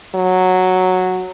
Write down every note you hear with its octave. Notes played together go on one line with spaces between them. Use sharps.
F#3